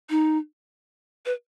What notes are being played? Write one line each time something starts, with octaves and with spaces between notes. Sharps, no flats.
D#4
B4